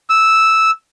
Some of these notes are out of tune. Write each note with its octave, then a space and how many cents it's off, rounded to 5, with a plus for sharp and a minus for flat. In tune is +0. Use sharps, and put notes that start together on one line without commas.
E6 -5